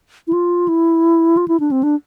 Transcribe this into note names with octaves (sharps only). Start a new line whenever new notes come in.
E4
F4
E4
F4
E4
D4
C4
D4